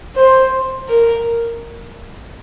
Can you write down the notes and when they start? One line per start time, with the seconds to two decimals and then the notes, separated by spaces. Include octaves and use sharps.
0.16 C5
0.88 A#4